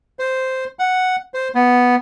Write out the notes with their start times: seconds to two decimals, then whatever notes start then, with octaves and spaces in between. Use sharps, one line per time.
0.19 C5
0.79 F#5
1.34 C5
1.55 B3